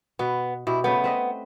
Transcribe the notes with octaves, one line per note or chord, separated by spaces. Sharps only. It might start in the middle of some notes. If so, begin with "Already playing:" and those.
B2 B3
B2 E4 G4
C#3 A3 B3 G5
C4 B4 D#5